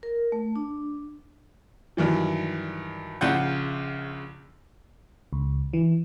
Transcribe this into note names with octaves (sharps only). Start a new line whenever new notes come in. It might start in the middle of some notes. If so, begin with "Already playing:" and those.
A#4
A3
D4
G2 D#3 E3 F#3
A#1 C#3 F4 F#5 G6
C#2
E3